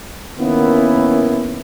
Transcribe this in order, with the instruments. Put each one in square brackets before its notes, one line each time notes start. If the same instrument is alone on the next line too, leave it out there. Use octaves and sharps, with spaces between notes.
[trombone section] D#3 A#3 B3 C#4 E4